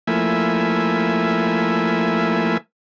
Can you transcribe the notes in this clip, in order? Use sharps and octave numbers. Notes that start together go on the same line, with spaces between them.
F3 A3 A#3 E4 E5 G#5